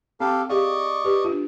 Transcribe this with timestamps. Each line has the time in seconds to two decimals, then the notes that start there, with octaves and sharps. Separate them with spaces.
0.20 C4 G4 A4 F5
0.50 G4 G#4 D5 D#5 F5 C#6
1.04 G4 B4
1.24 D4 F4